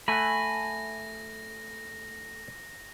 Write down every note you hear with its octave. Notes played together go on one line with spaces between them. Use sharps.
A3 F#5 G#5 B5 A#6